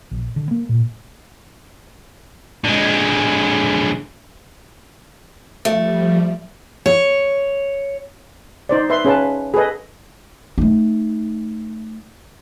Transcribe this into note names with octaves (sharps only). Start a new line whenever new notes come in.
A#1
D3
A#3
A#2
D3 G#3
F3 G3 A3
C#5
D#4 C5 D5
B4 E5 C6
C#4 G#4 B4 F5 A5
G#4 A4 B4 D#5
A3 D#4